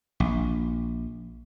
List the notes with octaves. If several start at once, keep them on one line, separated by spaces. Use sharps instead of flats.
A#1